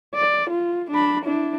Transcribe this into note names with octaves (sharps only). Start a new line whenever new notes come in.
D5
F4
D4 B5
D4 E4